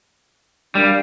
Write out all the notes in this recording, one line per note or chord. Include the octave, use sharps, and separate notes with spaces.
G3 D4 A#4 F5